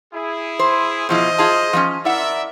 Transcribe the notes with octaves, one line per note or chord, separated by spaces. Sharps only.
E4 G#4
C5
B2 F3 E4 C5 D#5
F4 G#4 A5
F3 A#3 C#4
E4 A#4 D5 E5 F#5